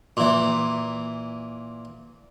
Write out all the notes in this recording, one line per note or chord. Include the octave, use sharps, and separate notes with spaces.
A#2 E3